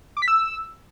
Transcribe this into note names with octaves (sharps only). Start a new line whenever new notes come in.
D6
B6
E6